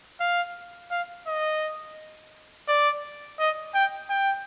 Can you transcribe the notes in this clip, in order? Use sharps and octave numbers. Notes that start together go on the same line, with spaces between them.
F5
F5
D#5
D5
D#5
G5
G5